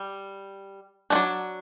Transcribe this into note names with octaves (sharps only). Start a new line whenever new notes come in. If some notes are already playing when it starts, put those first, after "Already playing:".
Already playing: G3
F#3 A3 D4 D5